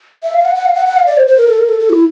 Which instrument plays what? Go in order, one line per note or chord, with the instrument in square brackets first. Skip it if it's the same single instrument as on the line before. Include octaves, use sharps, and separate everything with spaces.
[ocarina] E5
F5
F#5
F#5
F5
F#5
F#5
F5
D5
C5
C5
A#4
A4
A#4
A4
A4
E4